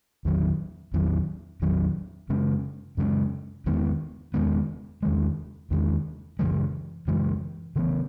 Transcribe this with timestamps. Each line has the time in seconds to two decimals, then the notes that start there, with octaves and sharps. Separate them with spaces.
0.25 E2 D#3 F#3
0.93 E2 D#3 F#3
1.62 E2 D#3 F#3
2.29 F#2 C#3 G#3 C#4
2.97 F#2 C#3 G#3 C#4
3.66 E2 D#3 G#3 B3
4.34 E2 D#3 G#3 B3
5.03 E2 D#3 G#3
5.71 E2 D#3 G#3
6.39 F#2 C#3 E3 G#3
7.08 F#2 C#3 E3 G#3
7.76 C#3 E3 B3